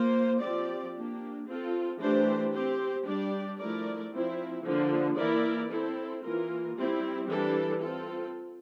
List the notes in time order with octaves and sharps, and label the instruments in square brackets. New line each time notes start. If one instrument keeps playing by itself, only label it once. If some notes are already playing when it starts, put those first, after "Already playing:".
Already playing: [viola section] A#3 F4 C5
F3 C4 G4 D5
A#3 D4 G4
C4 F4 A4
E3 A3 D4 G4 C5
C4 G4 C5
G3 D4 G4 D5
F3 A3 E4 A#4 D5
F3 C4 E4
D3 F3 A#3
E3 A#3 E4 A#4 D5
C4 E4 A4 C5
E3 A#3 F4 A#4
G3 C4 E4
E3 G3 D4 A4
C4 F4 A4